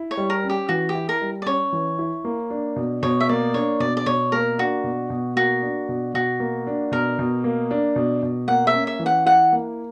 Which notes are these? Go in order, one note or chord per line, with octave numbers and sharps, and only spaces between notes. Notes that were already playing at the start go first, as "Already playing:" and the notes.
Already playing: E4
C#5
G3
A#4
C#4
G4
E3 F#4
G4
E4
A#4
G3
D5
C#4 C#5
E3
E4
A#3
D4
B2
B2 C#5
E5
A#3 D5
D4 C#5
B2 D5
D5
B2 C#5
A#3 A#4
D4 F#4
B2
B2
A#3 F#4
D4
B2
B2 F#4
A#3
D4
B2 A#4
B2
A#3
D4
B2
B2
A#3 F#5
E5
C#4
E5
E3
F#5
E4 F#5
A#3